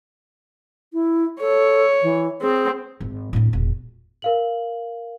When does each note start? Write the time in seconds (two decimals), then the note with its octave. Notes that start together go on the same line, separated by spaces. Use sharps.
0.93 E4
1.41 A4 C#5
2.03 E3
2.42 C4 G#4
3.00 G#1
3.33 A2 D4
3.53 E1 A#2
4.22 A#4 F5 F#7